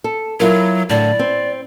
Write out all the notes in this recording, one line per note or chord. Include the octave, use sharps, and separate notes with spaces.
A4
F#3 E4 F4 A#4
A2 D3 D5
C4